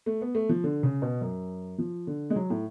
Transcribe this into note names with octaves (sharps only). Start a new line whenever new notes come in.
A3
B3
A3
F3
D3
C#3
B2
F#2
F3
D3
G#3
F#3
A2